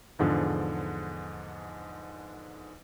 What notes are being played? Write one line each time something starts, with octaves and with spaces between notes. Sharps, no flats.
E2 G#2 D3 F3